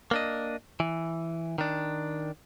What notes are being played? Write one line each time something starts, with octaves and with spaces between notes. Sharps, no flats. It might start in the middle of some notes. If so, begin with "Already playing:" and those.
A#3 D4 D#5
E3
D#3 D4